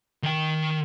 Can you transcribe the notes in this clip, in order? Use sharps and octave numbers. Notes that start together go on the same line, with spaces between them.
D#3 G5